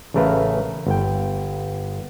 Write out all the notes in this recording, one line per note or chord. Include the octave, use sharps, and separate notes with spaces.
A1 C#3 A3 A#4 B4 F5
G1 G5